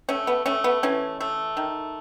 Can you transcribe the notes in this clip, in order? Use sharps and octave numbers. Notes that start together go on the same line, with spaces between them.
A3 C#4
B3
A3 C#4
B3
E3 C#4
A3
D#3